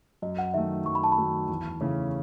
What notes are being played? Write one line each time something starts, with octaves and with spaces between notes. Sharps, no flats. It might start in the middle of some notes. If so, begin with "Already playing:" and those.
F#2 D#5
F#5
D#3 F#3 A3 E5
F#2 C#6
B5
A5
B5
D#3 F#3 A3
E2
C#3 E3 A3 C#4